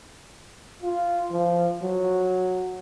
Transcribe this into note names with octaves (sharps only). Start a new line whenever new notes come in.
F4
F3
F#3